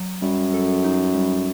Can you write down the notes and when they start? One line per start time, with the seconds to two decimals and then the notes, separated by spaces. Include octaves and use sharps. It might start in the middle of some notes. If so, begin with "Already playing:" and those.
Already playing: F#3
0.22 F#2 G3
0.54 A4
0.84 D#4
1.15 G3